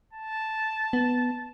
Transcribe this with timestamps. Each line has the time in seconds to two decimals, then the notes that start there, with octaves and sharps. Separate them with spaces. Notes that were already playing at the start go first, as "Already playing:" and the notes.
0.13 A5
0.93 B3